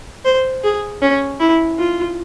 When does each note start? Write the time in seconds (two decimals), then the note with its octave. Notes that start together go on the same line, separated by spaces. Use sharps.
0.25 C5
0.64 G#4
1.02 C#4
1.40 E4
1.79 F4